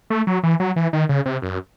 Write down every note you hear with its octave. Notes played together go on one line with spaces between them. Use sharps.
A3
F#3
E3
F#3
E3
D#3
C#3
C3
F#2